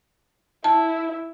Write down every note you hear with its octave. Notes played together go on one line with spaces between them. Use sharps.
E4 A5